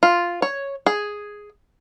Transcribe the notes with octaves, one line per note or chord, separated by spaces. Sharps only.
F4
C#5
G#4